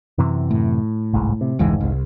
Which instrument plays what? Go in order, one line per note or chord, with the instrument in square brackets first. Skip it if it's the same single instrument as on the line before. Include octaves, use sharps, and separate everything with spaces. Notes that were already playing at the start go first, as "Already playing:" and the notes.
[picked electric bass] F#2 C3 E3
[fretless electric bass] A2
[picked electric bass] G1 C2 G#2
C3
[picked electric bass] F1 G#2 [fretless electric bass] C#2 E3 G#3
[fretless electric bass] C2